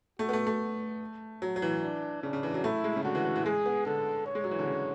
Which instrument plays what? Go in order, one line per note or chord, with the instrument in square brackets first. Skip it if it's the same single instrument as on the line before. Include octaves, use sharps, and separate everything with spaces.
[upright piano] A3 [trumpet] F#4
[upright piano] B3
A3
A3
F#3
F#3
E3
[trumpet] D4
[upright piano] C#3 [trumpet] D4
[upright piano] C#3
E3
F#3
[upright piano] A3 [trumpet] E4
[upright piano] G#3
C#3
[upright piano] D3 [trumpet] F#4
[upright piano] E3
E3
E3
[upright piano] G#3 [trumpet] G#4
[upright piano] B3
[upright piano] D3 [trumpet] A4
[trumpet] C#5
[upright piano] G#3
F#3
E3
D3
C#3